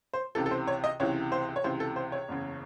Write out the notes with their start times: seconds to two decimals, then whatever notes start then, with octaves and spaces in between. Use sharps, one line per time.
0.13 C5
0.35 C#2 C3 E3 A4
0.46 A4
0.51 C5
0.67 C#5
0.84 D#5
1.00 C#2 C3 E3 C#5
1.32 C5
1.56 C#5
1.64 C#2 C3 E3 C5
1.80 A4
1.96 C5
2.12 C#5
2.28 F#1 E2 C#3